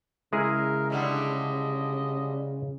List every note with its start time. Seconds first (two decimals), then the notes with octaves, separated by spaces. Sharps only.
0.33 C#3 G#3 E4 G#4 A#4
0.90 D3 G3 A3 D#5